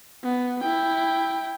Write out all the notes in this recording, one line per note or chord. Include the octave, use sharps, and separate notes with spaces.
B3
E4 G5